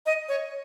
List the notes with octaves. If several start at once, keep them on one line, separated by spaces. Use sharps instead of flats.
D#5
C#5